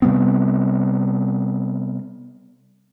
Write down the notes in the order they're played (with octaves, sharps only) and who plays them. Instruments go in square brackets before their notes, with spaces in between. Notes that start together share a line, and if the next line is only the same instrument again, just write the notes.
[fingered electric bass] C3 G3 B3 C4